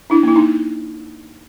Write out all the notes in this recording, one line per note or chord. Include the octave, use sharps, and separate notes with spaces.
D4 E4
A#3 E4
D#4